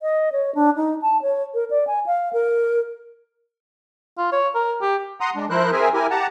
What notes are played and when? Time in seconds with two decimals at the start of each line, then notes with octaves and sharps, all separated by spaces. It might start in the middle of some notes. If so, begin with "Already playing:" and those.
0.02 D#5
0.32 C#5
0.55 D4
0.76 D#4
1.02 A5
1.22 C#5
1.54 A#4
1.70 D5
1.87 G#5
2.06 F5
2.33 A#4
4.18 F4
4.32 C#5
4.55 A#4
4.82 G4
5.21 F#5 A#5 C6 D#6
5.36 G#3 D4
5.50 F3 E4 A#4 C5 F#6
5.72 C4 G#4 A#4 E5 G#5
5.94 E4 G4 A#4 G#5
6.11 G4 F#5 A5 A#5